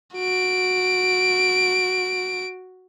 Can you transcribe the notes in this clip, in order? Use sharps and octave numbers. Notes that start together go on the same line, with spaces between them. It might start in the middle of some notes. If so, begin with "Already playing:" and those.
F#4 D7